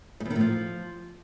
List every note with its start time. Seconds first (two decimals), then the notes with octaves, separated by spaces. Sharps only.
0.20 G#2
0.25 E2
0.30 D#3
0.35 A2
0.41 F3